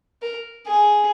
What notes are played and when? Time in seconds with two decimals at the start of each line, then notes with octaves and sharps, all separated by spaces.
0.22 A#4
0.67 G#4